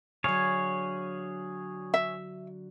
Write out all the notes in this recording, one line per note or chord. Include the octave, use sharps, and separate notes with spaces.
D3 F#3 G#4 C#5 F5
E5